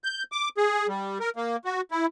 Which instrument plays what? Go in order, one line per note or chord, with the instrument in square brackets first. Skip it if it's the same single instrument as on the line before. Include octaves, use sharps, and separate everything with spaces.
[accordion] G6
D6
G#4
G3
A#4
A#3
F#4
E4